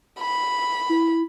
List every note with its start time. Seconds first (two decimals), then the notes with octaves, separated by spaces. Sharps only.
0.19 B5
0.89 E4